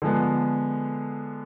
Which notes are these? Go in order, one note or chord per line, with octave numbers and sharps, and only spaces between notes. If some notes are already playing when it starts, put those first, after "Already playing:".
D3 F3 G#3 B3